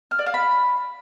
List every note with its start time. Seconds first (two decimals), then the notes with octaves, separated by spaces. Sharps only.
0.11 F6
0.19 D5
0.26 F5
0.34 B5